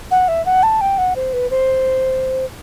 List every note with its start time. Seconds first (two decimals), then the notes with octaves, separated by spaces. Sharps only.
0.11 F#5
0.28 E5
0.46 F#5
0.63 A5
0.81 G5
0.98 F#5
1.16 C5
1.33 B4
1.51 C5